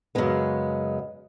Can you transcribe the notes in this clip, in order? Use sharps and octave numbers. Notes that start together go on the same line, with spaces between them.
F#2 C#3 G#3 B3